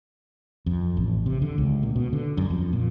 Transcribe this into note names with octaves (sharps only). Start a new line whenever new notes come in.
F2
A1
C3
D3
C#2
A#2
B2
D3
F#2
F2
A#2